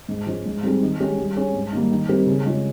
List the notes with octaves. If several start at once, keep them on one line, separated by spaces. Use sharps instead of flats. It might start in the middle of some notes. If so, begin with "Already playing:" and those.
G#2
F3 G#3 C#4
G#2
G3 C4 D#4 G#4
D#3
G#3 C#4 G4
G3
C#4 G#4
G#2
D#3 G3 A#3
D#3
G3 C4 G4 A#4
C#3
G#3 C#4 F4